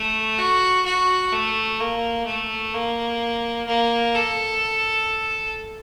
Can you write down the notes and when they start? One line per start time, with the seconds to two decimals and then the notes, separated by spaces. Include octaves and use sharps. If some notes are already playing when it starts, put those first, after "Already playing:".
Already playing: A3
0.39 F#4
0.85 F#4
1.32 A3
1.80 A#3
2.26 A3
2.74 A#3
3.67 A#3
4.14 A4